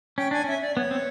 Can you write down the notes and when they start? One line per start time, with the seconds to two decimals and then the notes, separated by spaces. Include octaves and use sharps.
0.18 C#4 G5
0.31 D4 G#5
0.44 C#4 E5
0.62 D5
0.77 B3 C#5
0.91 C4